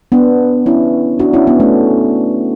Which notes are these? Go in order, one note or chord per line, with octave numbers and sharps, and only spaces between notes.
B3 D4
C#4 E4
D4 F#4
C#4 E4
B3 D4
A3 C#4